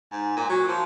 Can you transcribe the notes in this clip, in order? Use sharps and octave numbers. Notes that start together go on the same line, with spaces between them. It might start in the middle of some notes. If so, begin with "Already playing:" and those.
G#2
A#2
F#3
F3